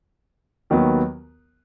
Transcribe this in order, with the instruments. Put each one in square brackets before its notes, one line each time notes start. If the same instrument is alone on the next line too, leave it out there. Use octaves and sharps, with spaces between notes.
[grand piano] D#2 D#3 F#3 B3